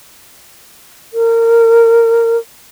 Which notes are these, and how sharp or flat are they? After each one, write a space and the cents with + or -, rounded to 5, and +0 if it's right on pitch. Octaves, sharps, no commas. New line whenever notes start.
A#4 -20